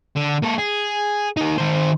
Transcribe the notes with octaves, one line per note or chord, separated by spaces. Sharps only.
D3
A#3 A4
G#4
A#3 D#4
D#3 C5